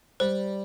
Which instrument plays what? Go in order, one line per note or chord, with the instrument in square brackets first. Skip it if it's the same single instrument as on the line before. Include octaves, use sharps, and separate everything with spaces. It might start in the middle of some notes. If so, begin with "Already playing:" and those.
[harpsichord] G3 [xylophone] C5